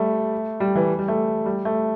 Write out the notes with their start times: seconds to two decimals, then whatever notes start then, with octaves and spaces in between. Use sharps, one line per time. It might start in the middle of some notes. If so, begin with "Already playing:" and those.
Already playing: G3 A3
0.60 G3
0.75 E3
0.99 G3
1.08 A3
1.46 G3
1.65 A3